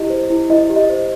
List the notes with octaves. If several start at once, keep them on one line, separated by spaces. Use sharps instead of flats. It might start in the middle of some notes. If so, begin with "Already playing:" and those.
Already playing: E4 G4 D#5
C5
E4
E4 D#5
G4
D#5
C5